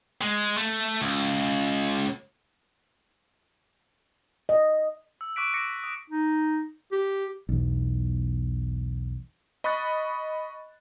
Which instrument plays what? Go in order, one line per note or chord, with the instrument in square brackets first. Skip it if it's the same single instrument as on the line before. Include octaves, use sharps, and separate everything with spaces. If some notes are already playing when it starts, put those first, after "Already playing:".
[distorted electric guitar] G#3
A3
C#2
[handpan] D#5
[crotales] E6
C#6 D6 F#6 B6 D7
D6 E6 A#6 B6 C#7
B6
D#6
[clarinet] D#4
G4
[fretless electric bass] B1 E2
[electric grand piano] D#5 B5 C#6 D#6 F#6 A6